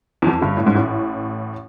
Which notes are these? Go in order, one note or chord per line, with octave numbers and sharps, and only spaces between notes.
E2
F2
G1 G2
A2
G#2
A1 A2